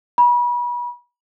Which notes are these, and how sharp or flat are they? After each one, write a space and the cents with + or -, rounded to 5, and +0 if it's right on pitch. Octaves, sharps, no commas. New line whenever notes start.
B5 -35